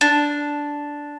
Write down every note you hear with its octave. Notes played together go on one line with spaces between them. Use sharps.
D4